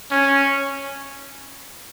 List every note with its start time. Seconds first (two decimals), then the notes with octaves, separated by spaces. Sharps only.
0.11 C#4